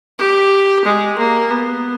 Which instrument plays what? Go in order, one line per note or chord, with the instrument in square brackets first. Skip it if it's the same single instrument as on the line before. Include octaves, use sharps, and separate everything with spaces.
[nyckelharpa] G4
G#3
A#3
B3